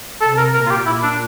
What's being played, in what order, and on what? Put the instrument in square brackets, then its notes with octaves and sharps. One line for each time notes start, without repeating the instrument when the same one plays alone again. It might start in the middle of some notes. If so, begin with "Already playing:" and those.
[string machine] C3 [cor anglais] A4
[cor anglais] A#4
[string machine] A#2 [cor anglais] A#4
[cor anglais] F4
G4
[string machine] A#2 [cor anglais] E4
[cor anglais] D4